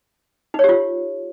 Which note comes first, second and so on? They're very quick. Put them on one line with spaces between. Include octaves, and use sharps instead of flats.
D#4 C#5 G4 F4